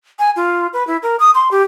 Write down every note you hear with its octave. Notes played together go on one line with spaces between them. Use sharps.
G#5
F4
B4
E4
A#4
D#6
C6
G4